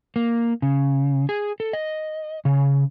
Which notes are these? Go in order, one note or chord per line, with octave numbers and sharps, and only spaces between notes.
A#3
C#3
G#4
A4
D#5
C#3